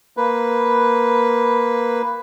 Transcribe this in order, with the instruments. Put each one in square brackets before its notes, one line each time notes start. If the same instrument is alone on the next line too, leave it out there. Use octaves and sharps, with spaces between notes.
[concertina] A#3 B4